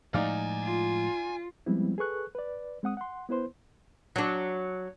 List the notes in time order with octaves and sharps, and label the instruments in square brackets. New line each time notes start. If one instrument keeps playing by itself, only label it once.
[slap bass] A2 F3 G#3 [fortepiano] D#4 D5 F5 [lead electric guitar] F#5 G#5
[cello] F4
[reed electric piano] F3 G3 G#3 B3 C4 E4
G#4 A4 B4 C#6 F#6
B4 D5
G#3 C4 F#5 D#6
F#5 C6
B3 E4 B4 C5 C6
[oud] F#3 D4